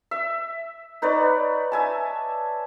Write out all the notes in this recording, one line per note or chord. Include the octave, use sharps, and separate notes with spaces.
E5
D#4 B4 C#5 D5
E5 G#5 A5